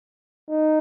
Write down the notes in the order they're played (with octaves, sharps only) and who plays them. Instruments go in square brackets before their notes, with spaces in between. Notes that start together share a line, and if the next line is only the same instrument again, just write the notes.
[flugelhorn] D#4